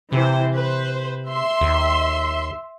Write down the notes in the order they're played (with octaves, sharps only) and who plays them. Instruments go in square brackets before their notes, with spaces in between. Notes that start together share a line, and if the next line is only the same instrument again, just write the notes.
[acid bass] C3 [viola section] E3 C5
[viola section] B4 C5
E5 C6
[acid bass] D#2